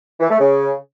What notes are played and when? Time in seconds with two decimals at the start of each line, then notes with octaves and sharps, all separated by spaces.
0.20 E3
0.30 A3
0.40 C#3